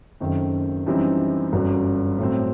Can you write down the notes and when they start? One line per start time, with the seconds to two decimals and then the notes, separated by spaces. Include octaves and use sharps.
0.20 F#1 F#2 D#3 A3 C4
0.87 F#2 E3 G3 C4 D#4
1.53 G1 F#2 F#3
2.19 A2 F#3 C4